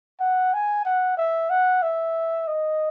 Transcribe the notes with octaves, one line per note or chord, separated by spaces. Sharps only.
F#5
G#5
F#5
E5
F#5
E5
D#5